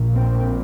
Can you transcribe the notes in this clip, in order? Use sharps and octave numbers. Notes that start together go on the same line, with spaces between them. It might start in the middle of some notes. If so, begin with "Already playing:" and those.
Already playing: A#1 A#2
C4